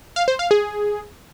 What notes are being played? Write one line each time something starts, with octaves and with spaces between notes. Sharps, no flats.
F5
C5
F5
G#4